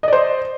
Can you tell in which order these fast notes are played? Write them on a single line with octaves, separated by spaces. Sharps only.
D#5 D5 C5